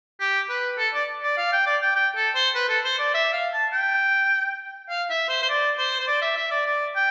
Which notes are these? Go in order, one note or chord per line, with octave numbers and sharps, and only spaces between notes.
G4
B4
A4
D5
D5
F5
G5
D5
G5
G5
A4
C5
B4
A4
C5
D5
E5
F5
A5
G5
F5
E5
C5
C5
D5
C5
C5
D5
E5
E5
D5
D5
G5